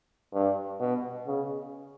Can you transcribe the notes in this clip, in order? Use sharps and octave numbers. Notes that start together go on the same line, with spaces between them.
G2
B2
C#3